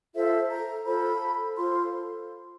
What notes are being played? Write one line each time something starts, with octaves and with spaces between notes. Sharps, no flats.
F4 A4 C5 E5
A#5
F4 A4 C5 B5
F4 A4 C5 C6